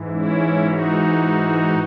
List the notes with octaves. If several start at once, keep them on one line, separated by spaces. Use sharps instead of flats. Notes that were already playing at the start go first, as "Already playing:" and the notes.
Already playing: G#2 E3
C#4 E4
D#4 F#4